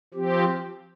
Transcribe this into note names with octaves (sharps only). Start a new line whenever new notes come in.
F3 C4 G4